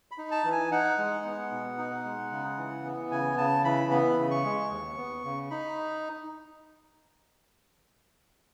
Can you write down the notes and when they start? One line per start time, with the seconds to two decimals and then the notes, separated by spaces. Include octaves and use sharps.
0.11 B5
0.18 D#4
0.31 A5
0.45 E3
0.52 G#5
0.71 D#4 F#5
0.98 G#3
1.25 B3
1.52 B2
1.78 D#4
2.05 G#3
2.31 C#3
2.58 E3
2.85 B3
3.11 C#3 G#5
3.38 C#3 A5
3.64 E3 B5
3.91 B3 B5
4.18 C#3
4.31 C#6
4.45 G#3
4.71 D#2
4.98 B3
5.24 C#3
5.51 D#4 B5